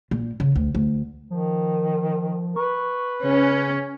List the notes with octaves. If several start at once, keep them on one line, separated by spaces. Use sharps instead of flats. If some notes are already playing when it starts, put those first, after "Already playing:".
A#2
C#3
D2
D2
D#3 F3
B4 C#6
C#3 C#4